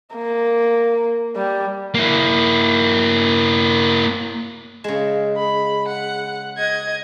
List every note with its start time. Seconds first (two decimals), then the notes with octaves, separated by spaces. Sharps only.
0.15 A#3
1.36 G3
1.94 A#3 E4
4.84 C#3 G#3
5.37 B5
5.88 F#5
6.57 D#5 G#6